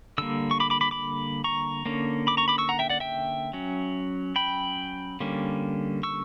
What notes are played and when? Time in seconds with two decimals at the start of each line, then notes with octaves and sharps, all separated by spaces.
0.18 D3 G3 A#3 E6
0.51 C#6
0.60 B5 D6
0.70 B5 D6
0.81 B5 D6
0.91 B5 D6
1.44 A#5 C#6
1.86 D3 A#3 C#4
2.27 B5 D6
2.37 A#5 C#6
2.48 B5 D6
2.58 C#6 E6
2.69 F#5 A#5
2.79 E5 G5
2.89 D5 F#5
3.00 E5 G5
3.53 F#3 C#4
4.36 G5 B5
5.20 D3 G3 A#3 C#4
6.03 C#6 E6